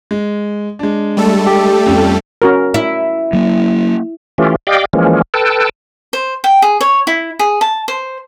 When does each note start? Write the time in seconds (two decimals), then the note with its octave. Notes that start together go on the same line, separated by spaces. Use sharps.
0.11 G#3
0.79 G#3 D4
1.17 G3 A3 A4
1.47 G4
1.86 F2 C#4 G5
2.42 C#4 F#4 A#4
2.74 E4
3.33 F#3 A#3
4.38 E3 A3 C#4 F4 G4
4.67 G4 D5 D#5 F5 G5
4.93 E3 F3 G#3 A#3 C#4
5.34 A4 B4 G5 A5
6.13 C5
6.44 G5
6.62 G#4
6.81 C#5
7.07 E4
7.39 G#4
7.61 A5
7.88 C5